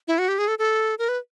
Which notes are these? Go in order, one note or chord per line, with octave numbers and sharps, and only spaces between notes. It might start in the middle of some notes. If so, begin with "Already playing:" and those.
E4
F#4
G4
G#4
A4
A4
A#4
B4